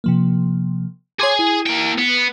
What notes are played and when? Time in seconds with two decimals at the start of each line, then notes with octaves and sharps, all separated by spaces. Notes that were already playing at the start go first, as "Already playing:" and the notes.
0.04 C3 F3 A#3
1.20 G#4 C#5 G#5 C6 D6
1.39 E4
1.66 A#3 G5
1.98 B3